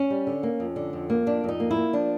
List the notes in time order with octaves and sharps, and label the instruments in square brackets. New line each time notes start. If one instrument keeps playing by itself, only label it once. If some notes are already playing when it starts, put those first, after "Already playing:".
Already playing: [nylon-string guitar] C#4
G3
D3
A#3
F2
D3
F2
A#3
F2 D4
F2 D#4
A#3
E4
A#3
F3 D4